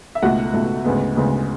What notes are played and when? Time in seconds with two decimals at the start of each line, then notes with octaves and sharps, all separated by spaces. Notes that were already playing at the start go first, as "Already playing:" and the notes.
0.15 E5
0.22 C#2 B2 A3 F#4 F#5
0.54 C#2 B2 A3
0.85 D2 C#3 G#3 B3
1.16 D2 C#3 G#3 B3